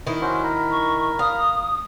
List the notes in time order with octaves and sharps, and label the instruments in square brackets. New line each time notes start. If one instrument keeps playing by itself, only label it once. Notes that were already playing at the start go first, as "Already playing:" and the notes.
[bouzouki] D#3 E4
[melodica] C#4 F#4 C5
A#4 B5
[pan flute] C#6
[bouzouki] F5 [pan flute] D#6